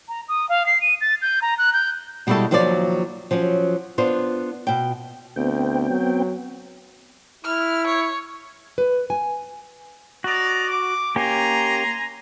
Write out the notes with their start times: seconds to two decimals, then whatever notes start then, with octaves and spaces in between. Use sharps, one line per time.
0.09 A#5
0.28 D#6
0.49 F5
0.66 C7
0.82 D#7
1.01 A6
1.22 G6
1.42 A#5
1.58 F#6
1.74 G6
2.27 B2 G3 G#3 E4 F#4 A4
2.51 D#2 F3 F#3 F4 G#4 D5
3.31 F3 F#3 C#4
3.98 B3 D4 F4 C5
4.67 B2 G5
5.36 D2 B3 C4 G5
5.90 F#3
7.45 E4 F6
7.87 C#5
8.78 B4
9.10 G#5
10.24 F#4 D5 D#5 A#5
10.68 D6
11.16 A#3 C#4 G4 G#5 A#5 C6